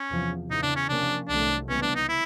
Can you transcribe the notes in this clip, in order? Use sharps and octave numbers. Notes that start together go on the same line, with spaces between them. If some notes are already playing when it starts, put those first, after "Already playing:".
Already playing: C#4
E2 C3 F3
E2 C#3 E3 D#4
D4
C#4
C3 F3 A#3 C#4 D4
C2 C3 D#3 F#3 A3 D4
C#2 C3 E3 G3 B3 C#4
D4
D#4
E4